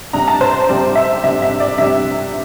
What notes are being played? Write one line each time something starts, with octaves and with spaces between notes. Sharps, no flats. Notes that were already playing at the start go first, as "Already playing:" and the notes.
C3 G3 D4 A#5
A5
C5
C3 G3 D4 D5
E5
C3 G3 D4 E5
E5
D5
C3 G3 D4 E5